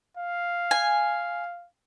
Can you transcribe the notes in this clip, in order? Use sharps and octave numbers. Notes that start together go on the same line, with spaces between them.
F5
G#5